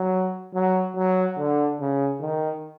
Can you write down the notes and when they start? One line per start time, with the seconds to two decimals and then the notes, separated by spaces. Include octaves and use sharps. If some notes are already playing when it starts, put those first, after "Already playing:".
Already playing: F#3
0.54 F#3
0.96 F#3
1.37 D3
1.80 C#3
2.21 D#3